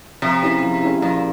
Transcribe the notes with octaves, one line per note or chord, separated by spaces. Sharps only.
C3 F3
G#3 C#4 E4 G4
F3
G#3 C#4 E4 G4
A#2 F3